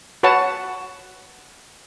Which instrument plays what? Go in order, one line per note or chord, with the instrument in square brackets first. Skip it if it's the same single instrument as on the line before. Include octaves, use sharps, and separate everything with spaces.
[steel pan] F#4 B4 C#5 F#5 A5